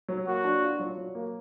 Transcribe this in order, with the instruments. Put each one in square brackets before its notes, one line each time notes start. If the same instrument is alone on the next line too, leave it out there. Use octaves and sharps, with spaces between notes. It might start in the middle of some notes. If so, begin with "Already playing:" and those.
[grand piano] F#3
[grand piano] A#3 [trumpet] F#4
[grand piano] D4
F4
F#3
F#3
A#3